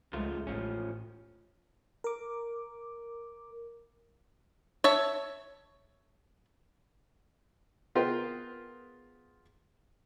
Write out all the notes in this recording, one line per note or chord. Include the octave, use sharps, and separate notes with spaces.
C#2 F3 G#3 A3 F4
A1 F3 C#4
A#4 D6
C#5 E5 A5
B3 F4 G#4 A#4 C5 G5